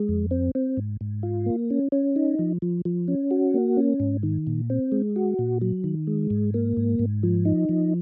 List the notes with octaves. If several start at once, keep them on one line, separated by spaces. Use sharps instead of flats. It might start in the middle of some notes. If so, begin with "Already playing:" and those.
Already playing: G#3
F2
C4
C4
G#2
G#2
F4
A#3
C#4
C#4
D#4
F3
F3
F3
C#4
F#4
A#3
C#4
G#2
D#3
A#2
C4
G#3
F#4
A#2
F#3
D#3
G#3
G#2
A#3
G#2
G#2
F3
D#4
F3